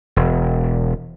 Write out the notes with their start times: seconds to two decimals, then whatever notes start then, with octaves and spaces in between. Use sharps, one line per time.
0.16 E1